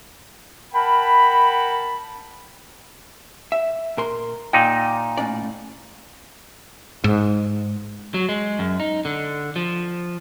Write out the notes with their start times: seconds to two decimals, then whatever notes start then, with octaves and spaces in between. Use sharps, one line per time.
0.74 A#4 F#5 G5 A5 B5
3.52 E5
3.97 A#2 A#4 C6
4.53 A#2 D#4 G5
5.18 A2 C#4 D5
7.04 G#2
8.14 F#3
8.29 G#3
8.59 F#2
8.80 D#4
9.05 D3
9.56 F3